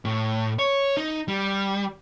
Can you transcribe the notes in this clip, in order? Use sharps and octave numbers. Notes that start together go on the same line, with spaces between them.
A2
C#5
D#4
G3